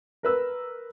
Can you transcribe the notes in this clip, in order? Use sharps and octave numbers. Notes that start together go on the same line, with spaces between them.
A#4 B4 E6